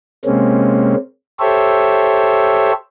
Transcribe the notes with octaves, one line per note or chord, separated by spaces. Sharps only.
C3 G#3 A#3 C4 C#4
G4 A4 C5 C#5 E5